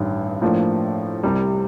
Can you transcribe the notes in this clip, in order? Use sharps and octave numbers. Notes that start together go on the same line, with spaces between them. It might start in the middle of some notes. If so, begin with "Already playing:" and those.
Already playing: A1 G2 D#3
A2 F3 A#3 D4
C2 C3 G3